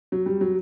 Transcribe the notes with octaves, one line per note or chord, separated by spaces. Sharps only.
F#3
G3
F#3